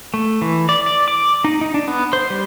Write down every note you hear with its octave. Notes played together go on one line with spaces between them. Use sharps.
A3
E3
D5
D5
D6
D#4
D#4
D4
B3
C5
G3